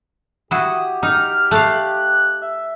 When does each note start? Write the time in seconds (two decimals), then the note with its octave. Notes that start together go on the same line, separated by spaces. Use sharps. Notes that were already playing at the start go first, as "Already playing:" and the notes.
0.51 E4 F#4 G4 D#6
1.03 D#4 F6
1.51 A3 F5 F#6
2.42 E5